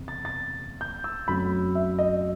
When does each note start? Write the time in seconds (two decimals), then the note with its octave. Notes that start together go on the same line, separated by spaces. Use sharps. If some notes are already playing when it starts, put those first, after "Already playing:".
Already playing: F#1 E2 C3
0.08 A6
0.25 A6
0.81 G6
1.04 E6
1.28 F#2 F#3 A3 C4 B5
1.75 E5
1.99 D#5